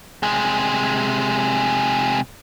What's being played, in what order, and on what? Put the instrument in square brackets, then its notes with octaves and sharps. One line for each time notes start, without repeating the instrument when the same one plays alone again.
[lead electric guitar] C3 G#3